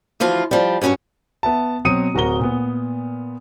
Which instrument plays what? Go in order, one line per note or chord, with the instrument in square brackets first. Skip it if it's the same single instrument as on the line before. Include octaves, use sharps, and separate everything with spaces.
[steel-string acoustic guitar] D2 E3 F3 F4
F3 G3
G2 F#3 C#4 A#4 C#5
[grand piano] B3 E5 A5
B2 F#3 C4 D#6 C#7 D#7
D1 F#4 A#4 A#5 G7
A#2 B3